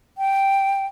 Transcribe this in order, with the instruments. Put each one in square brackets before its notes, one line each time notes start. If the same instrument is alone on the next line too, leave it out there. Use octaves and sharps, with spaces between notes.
[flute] G5